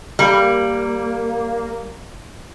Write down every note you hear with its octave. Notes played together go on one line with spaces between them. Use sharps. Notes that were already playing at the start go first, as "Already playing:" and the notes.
G3 A#3